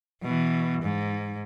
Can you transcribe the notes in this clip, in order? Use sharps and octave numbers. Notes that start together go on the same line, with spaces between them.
B2 E3
G#2